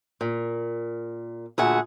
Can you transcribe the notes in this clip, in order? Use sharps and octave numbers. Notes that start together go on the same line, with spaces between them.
A#2
D2 A#2 G#4 E5 F#5